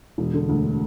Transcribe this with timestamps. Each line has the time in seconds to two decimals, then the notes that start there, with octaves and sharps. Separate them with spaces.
0.18 E1
0.34 D3
0.49 D2